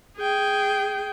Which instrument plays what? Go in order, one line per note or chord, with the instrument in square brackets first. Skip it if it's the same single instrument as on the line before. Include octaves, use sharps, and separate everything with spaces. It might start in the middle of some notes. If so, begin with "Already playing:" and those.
[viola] G#4 G5